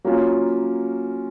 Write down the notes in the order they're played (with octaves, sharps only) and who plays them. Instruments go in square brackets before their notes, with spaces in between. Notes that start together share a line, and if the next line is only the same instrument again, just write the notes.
[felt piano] F#3 A#3 C#4 F4